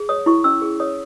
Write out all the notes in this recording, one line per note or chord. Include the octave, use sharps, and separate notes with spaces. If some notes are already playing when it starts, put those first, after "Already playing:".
Already playing: G#4
C#5 D#6
E4 C#6
C#4 E6
G#4
C#5 D#6